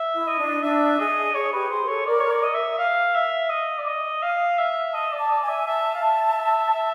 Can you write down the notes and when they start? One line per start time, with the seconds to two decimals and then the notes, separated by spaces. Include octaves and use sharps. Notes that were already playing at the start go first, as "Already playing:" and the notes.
Already playing: E5
0.14 E4
0.27 D#5
0.38 D4
0.63 D4 E5
0.99 G#4 D#5
1.34 G#4 C#5
1.53 G4 B4
1.70 G#4 C5
1.85 A#4
1.88 A4 C#5
2.07 A#4 D5
2.20 C#5
2.31 D5
2.43 D#5
2.54 E5
2.78 F5
3.15 E5
3.50 D#5
3.78 D5
3.87 D#5
4.23 F5
4.59 E5
4.94 D#5 A5
5.12 D5
5.18 A5
5.31 D5
5.42 G#5
5.49 E5
5.67 E5 A5
5.95 F5
6.02 E5
6.38 E5
6.74 E5